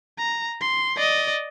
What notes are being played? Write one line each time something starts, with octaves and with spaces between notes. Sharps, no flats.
A#5
C6
D5 D#5